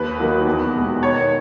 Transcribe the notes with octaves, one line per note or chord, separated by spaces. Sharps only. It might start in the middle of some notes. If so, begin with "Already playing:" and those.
Already playing: D#2 B4
D#3 F#3 A#3
E2
B2 G#3 B3
D#3 C#5